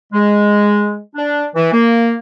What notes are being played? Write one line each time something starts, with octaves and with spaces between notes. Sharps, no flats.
G#3
D4
E3
A#3